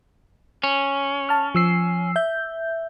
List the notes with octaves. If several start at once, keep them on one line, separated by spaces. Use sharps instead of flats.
C#4
A5 F6
F3 E6 C7
E5 G6